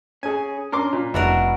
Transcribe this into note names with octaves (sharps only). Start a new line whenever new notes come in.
C#4 G#4 G#5
C#4 D4 A#4 C6 D6
A#2
F1 B2 D4 E4 F#4 A#4